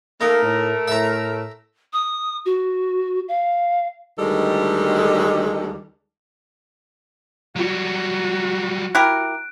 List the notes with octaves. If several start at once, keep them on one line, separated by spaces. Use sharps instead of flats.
A3 A#3 D#4 A#4
A2
A2 E5 A#5
D#6
F#4
F5
D2 D#3 G3 G#3 A4
F#3 G3 F#4
E4 G4 A#4 F#6 D7